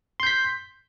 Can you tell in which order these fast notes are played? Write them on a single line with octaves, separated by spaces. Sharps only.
C6 G6 B6